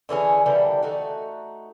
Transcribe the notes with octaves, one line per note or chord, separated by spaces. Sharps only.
D3 E3 C#4 G#4
D3 E3 G3 A#3
A3 D#4 F#4